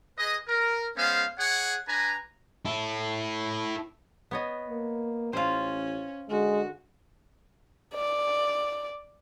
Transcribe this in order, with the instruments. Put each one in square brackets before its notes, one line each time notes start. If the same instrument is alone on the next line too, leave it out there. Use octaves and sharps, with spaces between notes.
[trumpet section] G#4 B4 D#5
A#4
G#3 B3 C#4 C5 F5
G#4 C#5 F#5
D4 B4 G#5 A#5
[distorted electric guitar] E4 A4
[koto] B3 C#5 D#5
[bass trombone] A#3
[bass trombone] A1 [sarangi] C#4 [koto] F4 C5
[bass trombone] D3 [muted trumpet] G#3 [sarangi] F#4
[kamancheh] D5